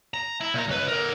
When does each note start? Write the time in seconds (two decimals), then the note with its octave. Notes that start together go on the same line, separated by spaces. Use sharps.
0.14 A#5
0.41 E4
0.54 A#2 A#5
0.68 C#2 B4
0.88 D3 A#4